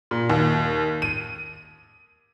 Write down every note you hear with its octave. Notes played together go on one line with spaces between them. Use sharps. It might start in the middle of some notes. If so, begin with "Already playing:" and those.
A#2
D#2
D#7